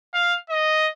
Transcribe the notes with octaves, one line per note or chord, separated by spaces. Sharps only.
F5
D#5